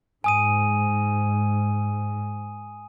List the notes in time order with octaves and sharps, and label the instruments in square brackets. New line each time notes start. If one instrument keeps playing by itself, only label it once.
[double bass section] G#2 [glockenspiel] G#5 D#6 D#7